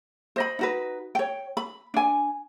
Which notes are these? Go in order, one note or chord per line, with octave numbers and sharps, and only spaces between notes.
C5 D#5 B5
D#4 F#4 B4
C#5 G5
B5
D4 G#5